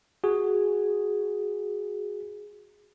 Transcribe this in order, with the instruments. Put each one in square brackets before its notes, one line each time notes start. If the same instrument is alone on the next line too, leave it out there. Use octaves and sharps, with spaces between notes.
[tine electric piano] F#4 G#4